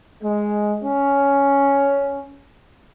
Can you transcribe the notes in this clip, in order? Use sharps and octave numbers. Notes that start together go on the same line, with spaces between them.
G#3
C#4